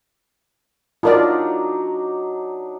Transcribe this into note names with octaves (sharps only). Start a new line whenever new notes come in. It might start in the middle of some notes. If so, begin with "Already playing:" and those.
F#3 D4 D#4 F4 A#4 D5